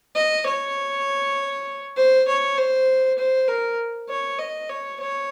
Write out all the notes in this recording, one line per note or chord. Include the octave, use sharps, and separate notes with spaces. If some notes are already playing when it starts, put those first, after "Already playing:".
D#5
C#5
C5
C#5
C5
C5
A#4
C#5
D#5
C#5
C#5